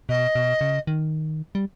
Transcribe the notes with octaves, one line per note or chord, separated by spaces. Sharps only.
B2 D#5
B2
C#3
D#3
G3